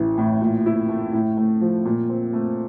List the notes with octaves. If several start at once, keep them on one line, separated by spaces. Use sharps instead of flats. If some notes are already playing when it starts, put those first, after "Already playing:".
Already playing: A1 E3
A2
A#2
E4
A3
A2
A3
F3
A#2
C4
A3